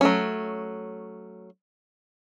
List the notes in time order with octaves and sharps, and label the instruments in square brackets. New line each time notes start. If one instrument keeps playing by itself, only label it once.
[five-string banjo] F#3 A3 C#4